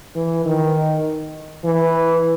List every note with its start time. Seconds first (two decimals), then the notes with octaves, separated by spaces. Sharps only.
0.16 E3
0.45 D#3
1.64 E3